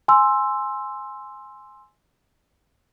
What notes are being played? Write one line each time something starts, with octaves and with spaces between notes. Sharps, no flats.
G#5 C6 E6